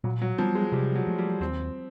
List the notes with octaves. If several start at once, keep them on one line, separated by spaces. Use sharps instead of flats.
A#2 F#3
F#3
F3 G3 B3
G#3
C3 G3
F#3
F3 A3
G3
D#2 C4